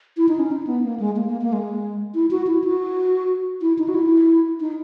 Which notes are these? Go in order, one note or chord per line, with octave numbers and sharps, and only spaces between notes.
E4
D#4
C#4
D#4
B3
A#3
G#3
A#3
A#3
A#3
G#3
E4
F#4
E4
F#4
E4
D#4
F#4
E4
D#4